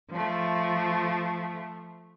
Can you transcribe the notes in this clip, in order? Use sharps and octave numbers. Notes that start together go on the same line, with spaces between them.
F3 A3